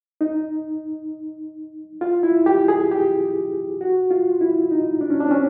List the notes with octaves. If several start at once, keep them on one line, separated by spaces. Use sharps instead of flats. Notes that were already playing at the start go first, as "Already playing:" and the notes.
D#4
F4
E4
G4
G#4
G4
F#4
F4
E4
D#4
D4
C#4
D4
C4
C#4